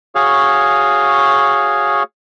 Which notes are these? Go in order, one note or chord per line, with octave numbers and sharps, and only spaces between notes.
F#4 G#4 C#5 F5